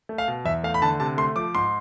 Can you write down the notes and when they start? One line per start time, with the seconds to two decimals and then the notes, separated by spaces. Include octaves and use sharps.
0.09 A3
0.18 F5
0.28 B2
0.45 E2 E5
0.64 A3 F5
0.74 B5
0.82 D3 A5
1.00 C3 A5
1.18 A3 C6
1.36 F3 D6
1.55 G#2 C6